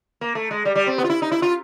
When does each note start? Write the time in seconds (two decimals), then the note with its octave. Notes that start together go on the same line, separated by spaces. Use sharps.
0.21 A#3
0.35 A3
0.51 G#3
0.65 G3
0.75 G3
0.87 C4
0.98 B3
1.04 F4
1.10 E4
1.22 D#4
1.31 E4
1.42 F4